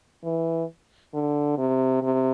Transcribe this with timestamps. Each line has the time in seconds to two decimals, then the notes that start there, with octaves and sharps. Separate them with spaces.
0.24 E3
1.14 D3
1.58 C3
2.02 C3